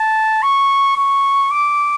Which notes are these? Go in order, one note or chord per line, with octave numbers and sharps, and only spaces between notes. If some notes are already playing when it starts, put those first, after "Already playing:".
Already playing: A5
C#6
C#6
D6